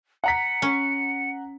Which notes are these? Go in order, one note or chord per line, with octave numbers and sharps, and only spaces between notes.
F#5 A#5 B6 C#7
C#4